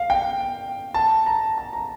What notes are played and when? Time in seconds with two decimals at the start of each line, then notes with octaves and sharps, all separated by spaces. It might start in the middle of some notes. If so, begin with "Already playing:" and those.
Already playing: F5
0.10 G5
0.94 A5
1.26 A#5
1.58 A5
1.73 A#5